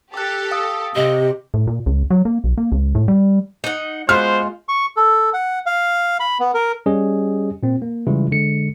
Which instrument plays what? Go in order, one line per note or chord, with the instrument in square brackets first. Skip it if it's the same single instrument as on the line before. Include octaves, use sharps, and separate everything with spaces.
[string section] G4 A4 [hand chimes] D6 F#6
[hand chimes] F5 D#6 E6
[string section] C3 [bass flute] G4 [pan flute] D#5
[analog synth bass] A2
A#2
C#2
F#3
A#3
B1
A#3
C#2
A2
G3
[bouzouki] D#4 F#5
[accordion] G#3 F4 [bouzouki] B3 F#4 [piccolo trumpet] C5 [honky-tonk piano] F6
[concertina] C#6
A4
F#5
F5
B5
B3
A#4
[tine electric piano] G3 C#4 G4 G#4 D#5
A#2 C4
A#3
C#3 E3 G3 G#3 E4 F4
D3 G#3 C#7